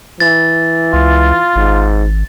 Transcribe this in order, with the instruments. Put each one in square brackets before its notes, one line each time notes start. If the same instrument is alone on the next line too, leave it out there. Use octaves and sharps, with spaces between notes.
[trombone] E3 [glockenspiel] A6
[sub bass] C#2 [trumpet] F4
[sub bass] G#1 [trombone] G#2